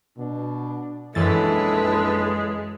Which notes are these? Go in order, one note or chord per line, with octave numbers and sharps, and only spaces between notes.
B2 D4
A#1 F#2 E3 G#3 E4 A4 B4 A6